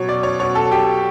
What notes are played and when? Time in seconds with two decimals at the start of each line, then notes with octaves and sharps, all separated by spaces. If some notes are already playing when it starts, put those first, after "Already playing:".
Already playing: B2 F#3 C#5
0.09 D5
0.23 C#5
0.39 B2 F#3 C#5
0.55 A4
0.72 G4